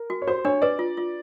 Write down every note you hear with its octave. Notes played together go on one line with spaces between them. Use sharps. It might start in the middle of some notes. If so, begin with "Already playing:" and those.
Already playing: A#4
F#4
C#5
F#4 C5
D4 C#5
B4 D5
F4
F4